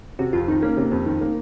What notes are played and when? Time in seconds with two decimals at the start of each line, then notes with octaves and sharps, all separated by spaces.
0.19 C3 F#4
0.33 F2 F4
0.48 D#3 D#4
0.62 A#3 C#4
0.77 C3
0.92 F2
1.06 D#3
1.21 A#3